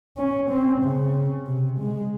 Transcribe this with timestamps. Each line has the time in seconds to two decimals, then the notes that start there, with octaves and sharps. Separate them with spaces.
0.17 C#4
0.50 C4
0.82 C#3
1.47 C3
1.79 G#3